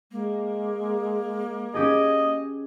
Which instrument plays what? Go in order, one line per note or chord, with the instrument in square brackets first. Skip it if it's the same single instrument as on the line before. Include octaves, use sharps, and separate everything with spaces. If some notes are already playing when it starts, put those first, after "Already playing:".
[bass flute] G#3 [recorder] A#3
[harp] C#4 G4 G#4 [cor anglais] D#5